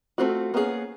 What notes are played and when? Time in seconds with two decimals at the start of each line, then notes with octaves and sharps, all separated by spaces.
0.18 A3 A#3 C4 F4 F#4
0.54 A#3 B3 C#4 D4 G#4